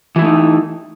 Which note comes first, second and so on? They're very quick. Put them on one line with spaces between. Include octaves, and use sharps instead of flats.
E3 E4 A3 D#4